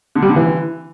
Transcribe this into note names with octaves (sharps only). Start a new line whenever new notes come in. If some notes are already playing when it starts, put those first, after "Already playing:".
D3
G3
D3
E3